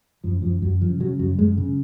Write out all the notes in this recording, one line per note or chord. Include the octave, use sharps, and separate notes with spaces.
F#2 F3
F#2 F3
F#2 F#3
C#3 F3
C#3 F#3
F#2 F#3
F#2 G#3
C#3